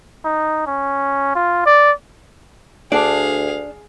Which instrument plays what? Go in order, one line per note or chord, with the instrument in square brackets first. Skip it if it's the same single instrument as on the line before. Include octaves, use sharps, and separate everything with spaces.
[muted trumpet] D#4
C#4
F4
D5
[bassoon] D2 [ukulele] D4 A5 [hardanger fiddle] G#4 F5 [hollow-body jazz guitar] D5